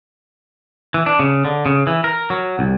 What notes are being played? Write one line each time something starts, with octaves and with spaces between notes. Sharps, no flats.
E3
D4
C#3
D3
C#3
E3
A#4
F#3
C2